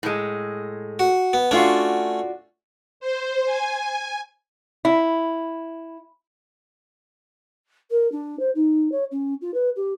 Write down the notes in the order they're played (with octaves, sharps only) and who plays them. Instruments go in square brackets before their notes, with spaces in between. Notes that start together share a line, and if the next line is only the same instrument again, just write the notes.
[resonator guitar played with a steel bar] A2 G#3
[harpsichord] F#4
B3
[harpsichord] A3 C#4 [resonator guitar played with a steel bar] D4 F4 F#4
[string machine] C5
G#5
[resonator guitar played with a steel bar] E4
[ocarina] A#4
D4
C5
D#4
C#5
C#4
F4
B4
G4